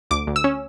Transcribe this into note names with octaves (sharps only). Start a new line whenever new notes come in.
D2 D6
D2
E6
C#4